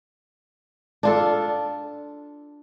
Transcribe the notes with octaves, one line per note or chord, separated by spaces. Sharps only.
D4 F4 A4